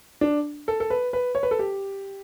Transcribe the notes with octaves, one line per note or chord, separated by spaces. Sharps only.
D4
A4
A4
B4
B4
C#5
B4
A4
G4